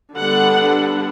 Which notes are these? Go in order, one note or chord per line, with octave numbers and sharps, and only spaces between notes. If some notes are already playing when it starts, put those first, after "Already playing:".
D3 G3 B3 D4 F#5